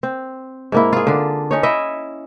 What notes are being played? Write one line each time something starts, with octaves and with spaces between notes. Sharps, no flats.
C4
G#2 A#3 E4
F4 G#4
D3 D4
C#4 D#4 C#5
E4 D#5 E5